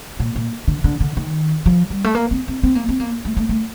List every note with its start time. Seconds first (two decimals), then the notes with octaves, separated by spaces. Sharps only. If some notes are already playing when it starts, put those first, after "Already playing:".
0.20 A#2
0.36 A#2
0.68 D3
0.84 D3
1.00 D3
1.17 D#3
1.66 F3
1.90 G3
2.04 A3
2.15 A#3
2.31 C4
2.48 C4
2.63 C4
2.75 A#3
2.89 C4
3.00 A#3
3.25 A3
3.37 A3
3.49 A3